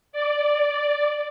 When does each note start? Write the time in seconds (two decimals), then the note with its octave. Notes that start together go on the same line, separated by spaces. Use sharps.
0.12 D5